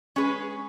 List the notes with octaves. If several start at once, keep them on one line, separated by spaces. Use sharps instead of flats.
G#3 C#4 G#4 B4